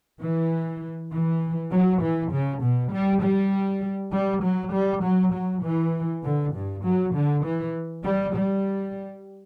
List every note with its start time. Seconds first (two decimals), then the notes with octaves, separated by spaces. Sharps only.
0.21 E3
1.12 E3
1.72 F#3
2.02 E3
2.32 C#3
2.62 B2
2.92 G3
3.22 G3
4.12 G3
4.42 F#3
4.72 G3
5.03 F#3
5.33 F#3
5.63 E3
6.23 D3
6.54 G2
6.84 F#3
7.13 D3
7.44 E3
8.03 G3
8.33 G3